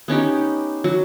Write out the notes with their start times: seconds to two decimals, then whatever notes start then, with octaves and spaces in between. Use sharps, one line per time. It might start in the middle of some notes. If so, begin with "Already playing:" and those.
0.08 B3 C#4 D#4 G4
0.84 F#3